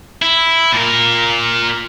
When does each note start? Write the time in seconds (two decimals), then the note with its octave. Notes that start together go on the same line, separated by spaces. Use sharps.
0.22 E4
0.73 A#2 A#4